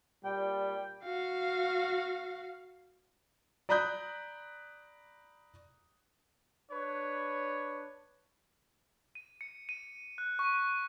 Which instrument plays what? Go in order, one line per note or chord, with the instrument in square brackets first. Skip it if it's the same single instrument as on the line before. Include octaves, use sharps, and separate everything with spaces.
[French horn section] A#2 D5 [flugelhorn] G3 [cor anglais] G5
[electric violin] F#4 F5
[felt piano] D5 A#5 B5 D#6 F#6 G6
[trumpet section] D4 B4 C#5
[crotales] D#7
C#7
D#7
F#6
C#6